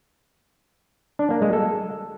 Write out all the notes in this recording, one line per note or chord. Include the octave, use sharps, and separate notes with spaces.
D4
A#3
G#3
A4